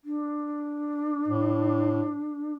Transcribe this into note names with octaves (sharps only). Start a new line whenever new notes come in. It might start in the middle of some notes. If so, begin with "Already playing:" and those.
D4
A2